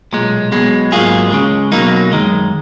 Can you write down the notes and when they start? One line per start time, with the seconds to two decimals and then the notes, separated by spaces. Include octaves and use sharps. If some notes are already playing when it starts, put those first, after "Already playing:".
0.13 B1 A#2 G#3
0.52 B1 B2 G#3
0.92 G#2 F#3 A#3 F4 G#4
1.31 C#2 C#3 G#3
1.72 B1 B2 F#3 A#3 D#4
2.12 F#2 D#3 G#3